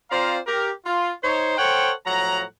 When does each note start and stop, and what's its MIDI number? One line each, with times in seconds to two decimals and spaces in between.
0.11 0.38 60
0.11 0.38 65
0.11 0.38 72
0.11 0.38 74
0.11 0.38 77
0.11 0.38 82
0.47 0.70 67
0.47 0.70 70
0.86 1.11 65
1.23 1.56 63
1.23 1.56 72
1.23 1.56 73
1.58 1.92 69
1.58 1.92 72
1.58 1.92 73
1.58 1.92 78
1.58 1.92 79
2.06 2.43 45
2.06 2.43 53
2.06 2.43 54
2.06 2.43 78
2.06 2.43 82